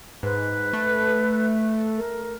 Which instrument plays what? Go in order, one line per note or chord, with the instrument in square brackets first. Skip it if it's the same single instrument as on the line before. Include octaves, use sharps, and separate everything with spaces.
[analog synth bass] G#2 [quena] B4
[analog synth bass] A3
[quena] A#4